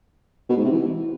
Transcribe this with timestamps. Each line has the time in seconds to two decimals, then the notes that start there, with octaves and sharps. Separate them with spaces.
0.49 B2
0.57 G#2
0.64 C3
0.72 E3